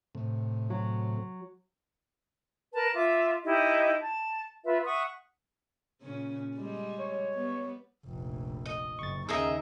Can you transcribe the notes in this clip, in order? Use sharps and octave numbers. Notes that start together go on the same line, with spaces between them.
A2 C3
F#3
A#4 B4 A5
F4 E5 D6
D#4 E4 G4 D#5
A5
F4 B4 E5
E5 F#5 C#6 D#6
A#2 C#3 C#4
G3 G#3
C#5
G3 B3
F1 A#1
D#5
F#1 C#6 A6
D#2 C#3 D#4 G#4 A#4 D#5 E5 E6